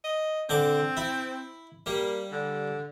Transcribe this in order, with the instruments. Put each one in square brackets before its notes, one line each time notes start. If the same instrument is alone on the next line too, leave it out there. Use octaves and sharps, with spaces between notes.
[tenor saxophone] D#5
[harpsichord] D3 D6 [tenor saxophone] C4
[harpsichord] E4
[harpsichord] G3 [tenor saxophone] A#3
[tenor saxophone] D3